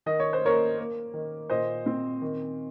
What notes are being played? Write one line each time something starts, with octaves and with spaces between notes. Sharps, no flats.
D#3 D#5
C#5
C5
A#3 A#4 C#5
A#3
D#3
A#2 C5 D#5
C4
D#3